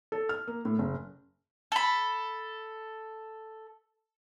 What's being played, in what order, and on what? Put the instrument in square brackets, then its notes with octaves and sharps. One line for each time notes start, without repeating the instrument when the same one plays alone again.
[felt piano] A4
F6
A#3
A2
F#1
[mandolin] A4 B5